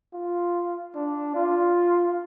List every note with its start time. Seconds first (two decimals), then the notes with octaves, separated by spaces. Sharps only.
0.14 F4
0.95 D4
1.35 F4